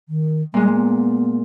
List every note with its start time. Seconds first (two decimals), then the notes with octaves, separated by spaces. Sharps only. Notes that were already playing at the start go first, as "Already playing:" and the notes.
0.09 D#3
0.54 A#2 G3 G#3
0.73 B3